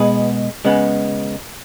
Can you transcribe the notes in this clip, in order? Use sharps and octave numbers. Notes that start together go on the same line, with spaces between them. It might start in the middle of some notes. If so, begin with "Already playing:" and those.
Already playing: B2 G#3 B3 G#4 B4
C#3 G#3 B3